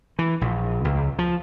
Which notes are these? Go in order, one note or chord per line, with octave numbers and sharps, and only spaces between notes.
E3
A#1
C#2
F3